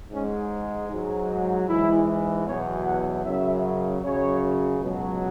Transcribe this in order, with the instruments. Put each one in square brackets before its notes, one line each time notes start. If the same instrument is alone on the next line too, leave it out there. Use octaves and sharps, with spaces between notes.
[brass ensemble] G#2 G#3 C#4
G#2 F#3
G#2 E3 G#3 E4
E2 B2 F#3 C#5
F#5
F#2 C#3 F#3 E5
F#2 C#3 F#3 C#5
C#2 B2 F#3